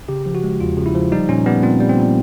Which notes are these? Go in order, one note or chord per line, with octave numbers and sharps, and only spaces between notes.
C#3 G4
F3
F#4
G#3
E2 F4
C#3
E4
F3
G3 D#4
A#2 C#4
G3 B3
A#2 C4
G3
C4
A#2